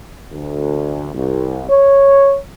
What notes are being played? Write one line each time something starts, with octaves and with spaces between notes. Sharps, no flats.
D2
C2
C#5